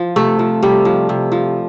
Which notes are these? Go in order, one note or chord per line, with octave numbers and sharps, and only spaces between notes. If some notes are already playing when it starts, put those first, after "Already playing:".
Already playing: F3
C3 A3
F3
C3 G3
F3
C3
F3